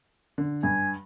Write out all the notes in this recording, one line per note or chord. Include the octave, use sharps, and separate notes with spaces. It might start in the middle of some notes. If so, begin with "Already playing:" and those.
D3
G2 G#5